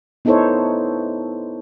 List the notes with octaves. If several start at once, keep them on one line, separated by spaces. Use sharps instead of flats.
B3 D#4 E4 A4 C5 C#5